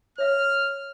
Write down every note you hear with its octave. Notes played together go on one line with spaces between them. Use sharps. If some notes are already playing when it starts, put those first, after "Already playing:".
C#5 E5 F5 F6